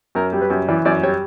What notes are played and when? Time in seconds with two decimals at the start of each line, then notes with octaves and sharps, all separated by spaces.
0.15 F#2 A#4
0.33 G3
0.41 B4
0.50 F#2
0.68 E3 D5
0.85 F#2 D5
1.02 G3 C#5